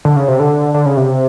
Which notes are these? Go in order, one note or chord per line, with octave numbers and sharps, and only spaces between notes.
D3
C#3
C3
D3
D3
C#3
C3